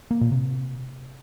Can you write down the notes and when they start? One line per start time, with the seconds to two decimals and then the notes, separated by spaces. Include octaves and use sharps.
0.11 A#3
0.21 A#2
0.32 C3